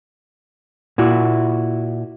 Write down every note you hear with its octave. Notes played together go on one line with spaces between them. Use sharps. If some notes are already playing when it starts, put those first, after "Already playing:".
A#2 E4 F#4